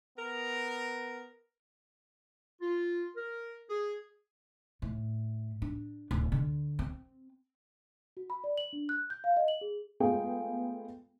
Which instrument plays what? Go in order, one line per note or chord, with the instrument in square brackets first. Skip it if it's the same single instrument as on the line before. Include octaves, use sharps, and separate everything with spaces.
[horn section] B3 A#4
[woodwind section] F4
A#4
G#4
[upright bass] A2
D4
D1
D3
C4
[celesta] F#4
B5
D5
F#7
D4
F#6
G6
F5
D#5
F#7
G#4
[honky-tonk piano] G#3 A3 B3 F4 G#4 G5